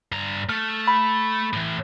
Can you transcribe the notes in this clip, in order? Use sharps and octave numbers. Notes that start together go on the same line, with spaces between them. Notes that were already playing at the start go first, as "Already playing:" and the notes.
G2 A#5
A3 F6
B5
A2 E3